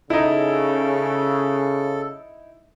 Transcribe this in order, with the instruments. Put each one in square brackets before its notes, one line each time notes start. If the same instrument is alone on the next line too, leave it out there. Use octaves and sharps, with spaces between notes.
[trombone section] C#3 [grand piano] D#4 E4 [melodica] A4